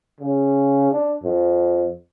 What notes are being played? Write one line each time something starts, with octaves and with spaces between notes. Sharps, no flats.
C#3
D4
F2